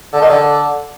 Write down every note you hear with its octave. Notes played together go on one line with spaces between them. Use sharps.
D3
D#3
D3